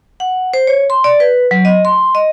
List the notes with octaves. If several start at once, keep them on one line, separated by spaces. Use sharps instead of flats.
F#5
C5
C#5
C6
D5
B4
F#3
D#5
C6
D#5